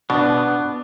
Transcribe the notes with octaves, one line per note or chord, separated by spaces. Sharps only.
B2 B3 D4